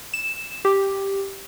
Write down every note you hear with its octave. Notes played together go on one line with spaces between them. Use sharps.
E7
G4